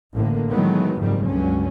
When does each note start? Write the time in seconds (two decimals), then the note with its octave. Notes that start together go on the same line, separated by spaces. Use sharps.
0.14 A1 A2 D3 A#3
0.50 D#3 E3 F#3 G#3 A3 B3
0.99 F#1 F2 G#2 D#3 F3 G3
1.27 C#2 G2 D3 F#3 C#4